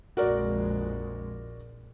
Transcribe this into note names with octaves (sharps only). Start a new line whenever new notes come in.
A#1 F2 G#3 F#4 A#4 D5